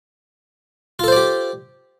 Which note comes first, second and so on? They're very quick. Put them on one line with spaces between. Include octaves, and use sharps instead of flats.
F4 A4 C5 D5 G4